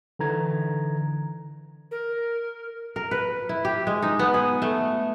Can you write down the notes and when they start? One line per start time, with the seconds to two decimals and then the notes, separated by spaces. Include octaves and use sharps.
0.19 D3 E3 A#5 G#6
1.91 A#4
2.96 A#4
3.11 B4
3.49 E4
3.65 G4
3.87 G#3
4.02 D#4
4.19 B3
4.34 G#4
4.62 A3